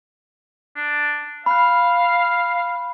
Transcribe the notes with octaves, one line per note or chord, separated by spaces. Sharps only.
D4
F5 B5 F#6